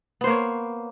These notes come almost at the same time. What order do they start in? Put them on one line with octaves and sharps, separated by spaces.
B3 C5 A#3 C#5